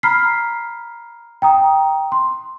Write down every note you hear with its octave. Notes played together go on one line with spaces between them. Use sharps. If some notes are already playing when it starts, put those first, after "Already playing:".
A#5 B5 F6 B6 C7
G5 A#5 D#6
C6